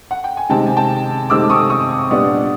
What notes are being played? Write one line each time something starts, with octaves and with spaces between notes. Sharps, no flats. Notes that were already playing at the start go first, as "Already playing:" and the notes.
F#5
G5
G#5
C3 D#3 G#3 C4 G5 A5
G#5
G5 A5
C3 D#3 G#3 C4 D6 E6
C#6 D#6
C#6 D#6
A#2 G3 B3 D4